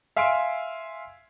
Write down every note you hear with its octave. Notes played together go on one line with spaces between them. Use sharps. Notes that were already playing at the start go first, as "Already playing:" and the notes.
E5 F5 G#5 C6 E6 D7